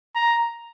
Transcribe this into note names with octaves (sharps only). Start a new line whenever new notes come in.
A#5